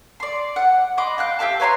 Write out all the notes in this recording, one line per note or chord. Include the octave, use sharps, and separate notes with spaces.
D5 C6
F#5
D#5 B5 C6 D6
F5 G5 F#6
G4 E5 F5 A5
B4 C#5 A#5 C6